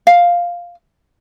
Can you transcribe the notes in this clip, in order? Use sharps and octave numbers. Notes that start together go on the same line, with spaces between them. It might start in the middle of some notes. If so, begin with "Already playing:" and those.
F5